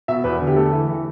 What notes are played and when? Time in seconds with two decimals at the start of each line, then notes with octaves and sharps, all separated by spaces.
0.08 B2 E5
0.24 E2 B4
0.40 D3
0.47 G4
0.56 A3 A4
0.72 E3
0.88 E3